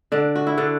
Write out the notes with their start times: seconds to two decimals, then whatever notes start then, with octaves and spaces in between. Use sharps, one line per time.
0.12 D3 D4
0.35 F#4
0.47 E4
0.58 D3 D4